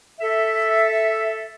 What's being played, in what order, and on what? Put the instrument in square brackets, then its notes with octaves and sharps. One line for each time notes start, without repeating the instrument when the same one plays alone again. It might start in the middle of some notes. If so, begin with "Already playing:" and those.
[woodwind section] A4 E5